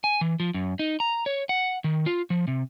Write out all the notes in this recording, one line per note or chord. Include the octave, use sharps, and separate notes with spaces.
G#5
E3
F3
F#2
D#4
A#5
C#5
F#5
D#3
F4
F3
C3